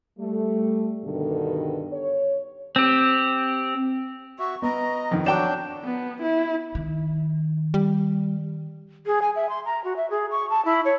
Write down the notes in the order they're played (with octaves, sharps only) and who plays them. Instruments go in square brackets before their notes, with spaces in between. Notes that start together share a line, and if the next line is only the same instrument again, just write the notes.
[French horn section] G3 A3
G2 B2 D3 D#3 G3 A4
C#5
[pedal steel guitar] C4 G4
[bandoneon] F#4 E5 [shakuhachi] C#6
[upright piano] B3 [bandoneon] D#5 [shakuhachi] A#5
[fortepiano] F2 D#3
[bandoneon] F#3 D4 G6 [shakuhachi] F#4 [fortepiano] D5 G5 D6 [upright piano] E7
[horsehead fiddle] B3
E4
[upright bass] D#3
[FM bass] G3
[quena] G#4
G#5
E5
C6
A#5
F#4
E5
G#4
C#6
A5
E4
C#5